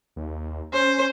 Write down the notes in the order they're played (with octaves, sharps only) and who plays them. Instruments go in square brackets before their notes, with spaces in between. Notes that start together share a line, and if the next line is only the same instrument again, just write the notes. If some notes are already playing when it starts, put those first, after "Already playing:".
[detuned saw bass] D#2
[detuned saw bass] C#4 [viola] C5